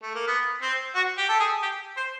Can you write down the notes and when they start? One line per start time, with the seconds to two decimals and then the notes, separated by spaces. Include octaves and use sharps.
0.02 A3
0.15 A#3
0.27 B3
0.62 C4
0.95 F#4
1.18 G4
1.29 A4
1.40 G#4
1.62 G4
1.97 C5